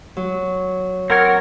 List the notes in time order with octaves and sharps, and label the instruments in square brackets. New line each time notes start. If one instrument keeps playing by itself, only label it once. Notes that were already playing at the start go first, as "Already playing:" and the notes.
[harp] F#3
[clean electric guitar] C4 C#5 [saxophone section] A#4 [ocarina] F#5 [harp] A#5